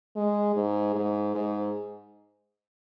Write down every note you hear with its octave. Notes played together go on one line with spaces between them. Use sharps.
G#3
G#2
G#2
G#2